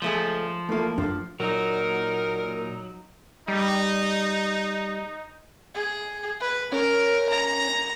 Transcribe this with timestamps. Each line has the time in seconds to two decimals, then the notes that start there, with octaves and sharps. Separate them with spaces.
0.02 C#2 F3 A3 G#4
0.69 E2 A3 A#3 E4 F4
0.98 F#2 F3 D4
1.40 A#2 F#3 D#4 A#4
3.48 G3 D#4
5.75 G#4
6.40 B4
6.72 C#4 A#4
7.29 A#5